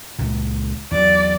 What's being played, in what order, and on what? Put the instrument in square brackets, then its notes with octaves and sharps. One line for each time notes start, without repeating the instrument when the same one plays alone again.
[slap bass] C#2 A#2
[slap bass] E2 F#3 [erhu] D5